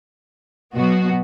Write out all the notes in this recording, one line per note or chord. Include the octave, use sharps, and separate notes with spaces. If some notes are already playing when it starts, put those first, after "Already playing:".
B2 F#3 B3 F#4